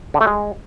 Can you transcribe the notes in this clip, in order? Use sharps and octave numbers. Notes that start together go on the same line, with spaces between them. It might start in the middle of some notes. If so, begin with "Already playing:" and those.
D3
A3
G#3